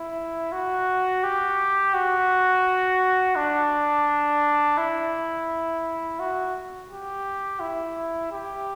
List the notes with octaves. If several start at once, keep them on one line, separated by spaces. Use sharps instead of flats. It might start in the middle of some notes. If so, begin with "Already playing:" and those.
Already playing: E4
F#4
G4
F#4
D4
E4
F#4
G4
E4
G4